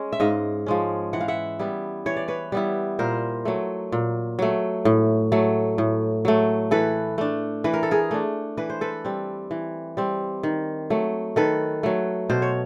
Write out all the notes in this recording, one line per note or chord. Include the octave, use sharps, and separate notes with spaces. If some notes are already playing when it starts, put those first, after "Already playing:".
Already playing: G#3 C#4
E5
G#2 D#5 F5
F3 G#3 C#4
E3 F#5
F5
E5 F#5
G3 B3 E4
E3 C#5
D5
B4 C#5
G3 B3 E4
A#2 A#4 C5
F#3 A3
A#2
F#3 A3
A2
F#3 A3
A2
F#3 A3
E3 A4 B4
A3 D4
E3 B4
A#4
A4
G#4 A#4
A3 D4
E3 B4
C5
A4 B4
G3 C4
E3
G3 C4
D#3
F#3 A3
D#3 A4 B4
F#3 A3
B2 C5
C#5